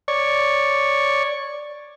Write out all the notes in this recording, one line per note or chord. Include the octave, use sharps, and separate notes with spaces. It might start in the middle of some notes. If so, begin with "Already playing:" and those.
C#5 D5 C#6